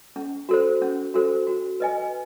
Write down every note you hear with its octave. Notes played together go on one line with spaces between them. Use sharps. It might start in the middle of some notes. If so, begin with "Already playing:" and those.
C#4
F#4 A4 C5
C#4
F#4 A4 C5
F#4
B4 D#5 G#5